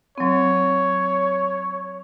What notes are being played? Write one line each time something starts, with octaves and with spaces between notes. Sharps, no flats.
F#3 C4 C#5